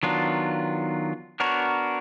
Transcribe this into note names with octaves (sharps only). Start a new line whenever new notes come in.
D#3 F#3 B3 D4 F4
B3 D4 F#4 A#4 C#5